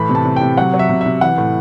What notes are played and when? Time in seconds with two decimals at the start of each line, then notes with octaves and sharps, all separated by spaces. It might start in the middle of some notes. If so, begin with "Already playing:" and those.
Already playing: A2 E3 B5
0.09 C3
0.15 A5
0.25 C3
0.36 C3 G5
0.57 F#3 F#5
0.74 F#3
0.79 E5
0.89 C3
1.01 C3 E5
1.21 E3 F#5
1.38 A2